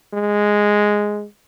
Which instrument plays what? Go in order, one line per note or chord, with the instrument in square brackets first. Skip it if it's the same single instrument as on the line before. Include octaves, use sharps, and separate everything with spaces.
[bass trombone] G#3